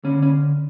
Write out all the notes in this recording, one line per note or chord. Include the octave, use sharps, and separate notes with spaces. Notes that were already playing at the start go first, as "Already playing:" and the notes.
D3 C#4
C#4